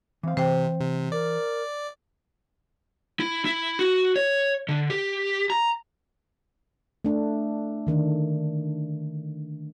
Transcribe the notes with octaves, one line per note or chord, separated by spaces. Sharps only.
E3 C4 F5
C3 E3 C5 G5
C3
A#4 D5
E4
E4
F#4
C#5
D3
G4
A#5
A3 D4
D3 D#3 D4